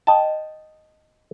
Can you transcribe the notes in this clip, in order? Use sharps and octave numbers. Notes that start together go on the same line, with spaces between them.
D#5 G5 A5